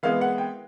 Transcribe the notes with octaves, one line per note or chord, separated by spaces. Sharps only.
E3 G#3 B3 F5
F#5
G5